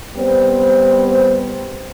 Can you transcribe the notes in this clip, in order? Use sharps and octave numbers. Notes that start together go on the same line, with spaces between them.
G3 B3 C4 C5